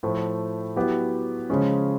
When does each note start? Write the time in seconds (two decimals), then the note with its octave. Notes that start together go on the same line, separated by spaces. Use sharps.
0.03 A2 F3 A3
0.76 F#3 B3 E4 G4
1.50 C#3 F3 G#3 C#4